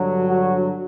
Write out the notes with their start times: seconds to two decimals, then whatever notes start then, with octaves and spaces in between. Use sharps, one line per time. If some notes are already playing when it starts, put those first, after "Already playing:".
Already playing: G2 D3 F#3
0.28 F#4